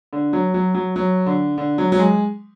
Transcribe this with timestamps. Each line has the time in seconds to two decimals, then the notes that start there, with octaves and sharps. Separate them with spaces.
0.13 D3
0.33 F#3
0.54 F#3
0.74 F#3
0.96 F#3
1.26 D3
1.58 D3
1.78 F#3
1.92 F#3
1.99 G#3